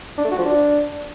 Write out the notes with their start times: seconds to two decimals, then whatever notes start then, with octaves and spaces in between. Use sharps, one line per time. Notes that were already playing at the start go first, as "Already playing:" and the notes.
0.18 D4
0.24 A3
0.31 F#4
0.38 F3
0.45 D4